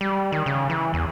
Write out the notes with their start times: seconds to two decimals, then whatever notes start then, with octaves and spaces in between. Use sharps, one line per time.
0.01 G3
0.32 D#3
0.46 C#3
0.70 E3
0.94 E2